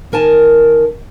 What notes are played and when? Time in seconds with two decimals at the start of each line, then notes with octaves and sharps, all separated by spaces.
0.12 D#3 A#4 G#5 A5